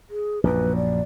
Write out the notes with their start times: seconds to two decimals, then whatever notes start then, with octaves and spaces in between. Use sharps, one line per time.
0.10 G#4
0.44 A#1 F#2 B4
0.76 D5